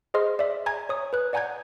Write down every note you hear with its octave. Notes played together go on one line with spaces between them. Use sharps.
G#4 C5 D#5 C6 F6
D5 E5
G#5 A#5 G#6
C#5 D#6
B4 F#6
D5 F#5 G#5 A#5 G6 G#6